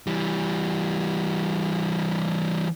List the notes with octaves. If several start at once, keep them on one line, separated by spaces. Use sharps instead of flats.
E3 G3